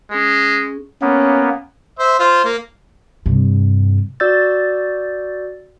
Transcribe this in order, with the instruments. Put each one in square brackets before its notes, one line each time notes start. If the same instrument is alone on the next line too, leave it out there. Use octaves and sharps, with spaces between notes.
[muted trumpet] G#3 [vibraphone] C#4 G#4
[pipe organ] A#3 B3 [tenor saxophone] C#4
[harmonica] C5 E5
F4 C5
A#3
[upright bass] G2 C3
[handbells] F#4 D5 E6 G6 A6